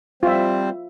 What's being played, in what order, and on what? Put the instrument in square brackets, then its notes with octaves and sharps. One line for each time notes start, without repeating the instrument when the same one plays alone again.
[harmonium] G3 C4 C5 [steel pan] F4 E5